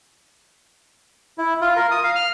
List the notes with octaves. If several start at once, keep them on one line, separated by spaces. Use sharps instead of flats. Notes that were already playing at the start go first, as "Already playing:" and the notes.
E4
F4
A#4
D#6
F5
F6